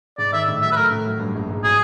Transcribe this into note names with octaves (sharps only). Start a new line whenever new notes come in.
G#2 D5
D#3 E5
A2
F#3 E5
B4
A3 A#4
A2
F#3
G2
A#1
G#2
F#3 G#4